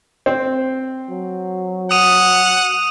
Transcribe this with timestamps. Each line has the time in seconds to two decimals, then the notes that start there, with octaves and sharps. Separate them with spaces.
0.26 C4
1.10 F#3
1.91 F#5 D#6 D#7